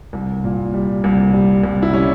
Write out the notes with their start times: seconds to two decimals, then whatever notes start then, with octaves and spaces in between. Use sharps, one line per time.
0.13 C2
0.44 A#2
0.74 G3
1.04 C2
1.33 G3
1.63 C2
1.82 E4
1.93 G3 C#4